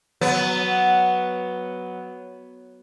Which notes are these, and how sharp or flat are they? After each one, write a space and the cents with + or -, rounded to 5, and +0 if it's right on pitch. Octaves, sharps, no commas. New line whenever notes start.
F#3 +0 B3 +0